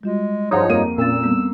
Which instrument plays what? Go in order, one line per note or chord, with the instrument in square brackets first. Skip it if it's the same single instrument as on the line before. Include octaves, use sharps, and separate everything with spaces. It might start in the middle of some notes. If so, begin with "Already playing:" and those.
[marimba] G3 F4 F#4 [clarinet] G#3
[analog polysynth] G2 F3 D#4 [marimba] F4 G#4 F#5 [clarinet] C#5
[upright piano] F2 A#3 D#7
[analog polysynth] A#2 [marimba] C4 C#4 A6 [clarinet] E6
[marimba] G3 B3 C4